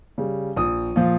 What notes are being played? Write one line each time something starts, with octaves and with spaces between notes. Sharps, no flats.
C#3 G3
A#1 D#6
A#2 F3